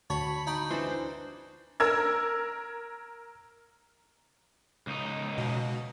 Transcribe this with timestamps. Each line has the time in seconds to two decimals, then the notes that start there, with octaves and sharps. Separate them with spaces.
0.10 D2 F#4 C#5 A5 B5
0.47 D#4 G5
0.71 E3 D4 C5
1.80 A#4 E6 G#6
4.87 C#2 D#4
5.38 B2